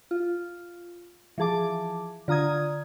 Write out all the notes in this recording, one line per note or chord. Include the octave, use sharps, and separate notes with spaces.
F4
E3 F3 G#4 A5 D6
D3 F4 A#5 D#6 G#6